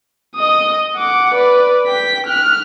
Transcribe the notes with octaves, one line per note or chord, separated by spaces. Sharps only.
D#5 D#6
F#5 D6
B4 D5
G5 B6
F6 F#6